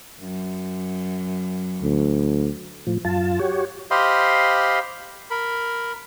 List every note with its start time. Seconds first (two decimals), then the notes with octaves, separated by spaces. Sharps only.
0.20 F#2
1.82 D2
2.87 A2 F3
3.05 F#2 F4 A5
3.39 F#4 G4 C#5
3.91 G4 C5 D#5 F5 B5 C6
5.31 A#4 B5